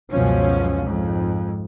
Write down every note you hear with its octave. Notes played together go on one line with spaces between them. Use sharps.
C#2 F#2 B2 F3 C#4
F2 G#2